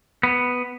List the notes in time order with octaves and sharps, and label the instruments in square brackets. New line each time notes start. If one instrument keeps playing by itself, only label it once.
[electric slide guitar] B3